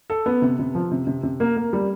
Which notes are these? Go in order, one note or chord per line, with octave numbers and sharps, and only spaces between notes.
A4
B3
C3
C3
F3
C3
C3
C3
A#3
A#3
G3